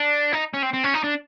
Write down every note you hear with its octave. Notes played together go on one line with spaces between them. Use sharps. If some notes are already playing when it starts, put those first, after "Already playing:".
Already playing: D4
D#4
C#4
C4
C4
C#4
D#4
D4